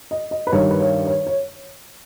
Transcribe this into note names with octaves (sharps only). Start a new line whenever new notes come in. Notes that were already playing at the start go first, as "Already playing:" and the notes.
D#5
D#5
B4
G2 D#3 G3 C#5
B4
C#5
C#5
C#5